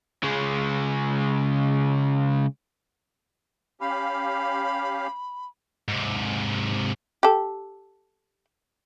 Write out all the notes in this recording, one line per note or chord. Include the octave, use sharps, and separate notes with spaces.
C#3 G#3
C#4 G4 F5 B5
G#2 C3
G4 A4